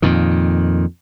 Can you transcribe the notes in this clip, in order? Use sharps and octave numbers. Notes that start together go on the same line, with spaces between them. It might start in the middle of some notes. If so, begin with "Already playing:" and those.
F2 A#2 D#3